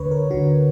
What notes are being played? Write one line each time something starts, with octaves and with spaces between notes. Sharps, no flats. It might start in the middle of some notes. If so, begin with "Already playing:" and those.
Already playing: D2 D3 B4 C#5
A#4
D2 D3 F#4